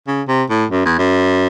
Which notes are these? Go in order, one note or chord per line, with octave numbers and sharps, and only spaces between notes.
C#3
C3
A2
F#2
E2
F#2